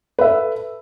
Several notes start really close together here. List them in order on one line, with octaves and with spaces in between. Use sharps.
B4 E5 A4